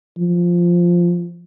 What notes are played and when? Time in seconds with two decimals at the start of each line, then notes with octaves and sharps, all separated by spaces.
0.18 F3